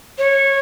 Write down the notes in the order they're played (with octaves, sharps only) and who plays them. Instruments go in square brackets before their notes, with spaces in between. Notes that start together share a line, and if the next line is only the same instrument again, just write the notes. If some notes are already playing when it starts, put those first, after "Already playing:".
[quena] C#5